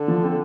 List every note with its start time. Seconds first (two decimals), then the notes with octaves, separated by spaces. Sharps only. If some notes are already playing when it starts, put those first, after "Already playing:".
Already playing: D3
0.08 F3
0.23 C4